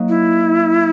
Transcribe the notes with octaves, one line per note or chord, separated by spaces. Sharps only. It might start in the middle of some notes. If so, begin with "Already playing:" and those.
Already playing: F#3 A#3 D#4
E4